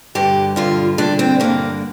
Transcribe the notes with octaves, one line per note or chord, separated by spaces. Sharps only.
G2 D3 G4
G2 D3 F4
G2 D3 D4
C4
G2 D3 A#3